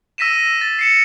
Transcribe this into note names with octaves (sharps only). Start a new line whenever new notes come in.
E6 A#6 B6 D#7 E7
A6
C7 C#7 E7